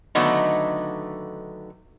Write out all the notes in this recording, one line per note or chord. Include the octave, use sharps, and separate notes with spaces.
D3 D#3 F#3 A3 B3 D#4